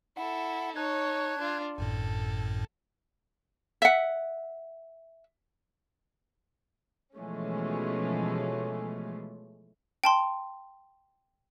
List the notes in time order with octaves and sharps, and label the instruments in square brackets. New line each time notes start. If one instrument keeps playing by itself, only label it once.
[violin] E4 A4 [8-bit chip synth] F#5
[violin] D#4 C#5 [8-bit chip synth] A5 F#6 G#6
[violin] D4 F4
[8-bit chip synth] G#1 F#2 A2 [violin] A4
[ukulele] E5 F#5
[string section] B2 E3 F3 G#3 A3 C#4
[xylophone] G5 A5 C6